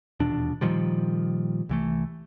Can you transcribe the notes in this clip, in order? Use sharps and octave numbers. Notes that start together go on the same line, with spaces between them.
D#1 E2 B2 D4
A#2 D#3 F3 G3
C2 E3 A3